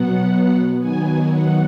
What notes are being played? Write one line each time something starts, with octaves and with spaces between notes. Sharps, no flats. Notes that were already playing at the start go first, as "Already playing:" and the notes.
Already playing: B2 F#3 B3 F#5
D#3 F#3 B3 G#5
F#5